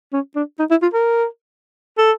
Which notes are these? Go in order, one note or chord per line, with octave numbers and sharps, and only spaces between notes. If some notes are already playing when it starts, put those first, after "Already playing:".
C#4
D4
D#4
E4
F4
A#4
A4